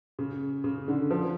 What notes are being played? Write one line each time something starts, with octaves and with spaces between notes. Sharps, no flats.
C#3
C#3
D3
F3